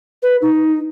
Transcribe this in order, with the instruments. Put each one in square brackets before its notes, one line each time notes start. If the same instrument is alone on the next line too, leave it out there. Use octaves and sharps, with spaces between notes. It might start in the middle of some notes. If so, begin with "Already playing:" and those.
[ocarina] B4
D#4